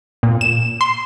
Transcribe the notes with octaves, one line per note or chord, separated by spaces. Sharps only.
A#2
E7
C6